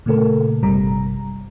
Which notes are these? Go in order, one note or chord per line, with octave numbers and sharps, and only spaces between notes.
A#2 C#3 A3 A4 A#4
G#1 G2 C3 G3 A#5